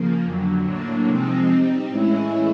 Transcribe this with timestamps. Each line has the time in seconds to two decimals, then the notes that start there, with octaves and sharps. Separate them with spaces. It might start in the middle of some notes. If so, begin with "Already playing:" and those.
Already playing: C#3 F3 A#3
0.24 F2 D3 F#3
0.65 A2 F#3 A#3 D4
1.06 C3 F3 G#3 C4 D#4
1.48 G3 C4 D#4
1.89 A2 E3 G#3 C#4 E4